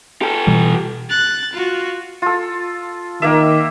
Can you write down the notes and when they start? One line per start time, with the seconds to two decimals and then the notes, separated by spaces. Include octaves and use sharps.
0.22 G4 A4
0.47 B2 E3 G3
1.10 F#6 A6
1.53 F4 F#4
2.22 F4 A4
3.22 D#3 A#3 A#4 E5